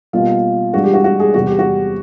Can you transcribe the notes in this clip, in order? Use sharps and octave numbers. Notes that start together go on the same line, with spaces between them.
B2 G3 A#3 F4
G2 E3 G#3 F#4
G4
F#4
F#4
G#4
E2 C3 E3 G3 F#4
G4
F#4